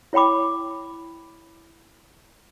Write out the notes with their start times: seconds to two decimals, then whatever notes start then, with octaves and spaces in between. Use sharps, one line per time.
0.13 E4 C#5 G5 B5 D6